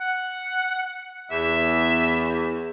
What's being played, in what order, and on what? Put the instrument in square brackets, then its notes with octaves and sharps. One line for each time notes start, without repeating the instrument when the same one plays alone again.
[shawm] F#5
[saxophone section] E2 [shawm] E5